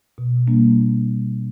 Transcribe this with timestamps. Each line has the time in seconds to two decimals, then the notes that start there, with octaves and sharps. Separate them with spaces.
0.18 B2
0.47 G3 A#3 D4